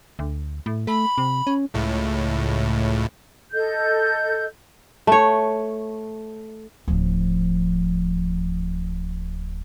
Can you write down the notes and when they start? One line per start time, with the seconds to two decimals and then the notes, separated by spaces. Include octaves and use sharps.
0.19 D2
0.66 A2
0.87 A3 B5
1.18 C3
1.47 C#4
1.74 C#2 A2
3.53 A4 D#5 G6
5.07 A3 C#5
6.88 D1 F3